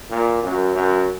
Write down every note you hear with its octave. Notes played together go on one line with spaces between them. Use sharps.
A#2
F#2
F#2